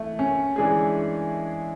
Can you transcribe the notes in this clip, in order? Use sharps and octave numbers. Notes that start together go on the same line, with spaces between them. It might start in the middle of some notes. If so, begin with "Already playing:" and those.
Already playing: E3 A3
C#4
E3 G#3 D4 G#4